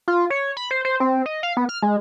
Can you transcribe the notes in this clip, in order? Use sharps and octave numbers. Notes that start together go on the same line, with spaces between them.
F4
C#5
B5
C5
C5
C4
D#5
F5
B3
F6
G#3